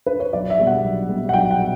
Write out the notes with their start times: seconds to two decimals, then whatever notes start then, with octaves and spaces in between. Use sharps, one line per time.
0.06 B4
0.20 C#5
0.33 B1 D5
0.50 E5
0.58 B2 G3 B3
0.67 F#5
0.84 B1
1.08 B2 G3 B3
1.29 F#5
1.33 B1 G5
1.51 F#5
1.59 B2